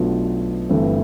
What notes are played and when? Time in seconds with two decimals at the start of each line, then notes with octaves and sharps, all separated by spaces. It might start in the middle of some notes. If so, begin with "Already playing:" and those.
Already playing: B1 B2 A3 D4 F4
0.69 G1 G2 E3 A3 C4